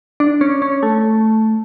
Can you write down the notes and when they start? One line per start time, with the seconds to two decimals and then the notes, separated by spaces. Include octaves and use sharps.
0.20 D4
0.41 C#4
0.62 C#4
0.83 A3